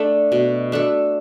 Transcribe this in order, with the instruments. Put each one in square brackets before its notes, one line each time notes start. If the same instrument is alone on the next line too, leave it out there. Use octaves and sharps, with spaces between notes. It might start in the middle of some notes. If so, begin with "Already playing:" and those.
Already playing: [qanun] A3 D4 A4
B2
A3 D4 A4